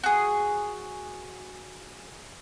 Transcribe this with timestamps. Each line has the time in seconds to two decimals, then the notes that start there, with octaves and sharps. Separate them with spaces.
0.03 F#4 G#4